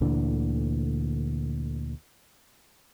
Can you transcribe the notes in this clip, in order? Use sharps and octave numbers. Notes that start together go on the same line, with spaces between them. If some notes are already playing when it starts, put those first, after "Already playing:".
D2 A#2 D3 E3